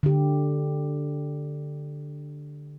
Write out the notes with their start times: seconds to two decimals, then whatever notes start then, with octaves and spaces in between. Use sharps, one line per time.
0.03 D3 G4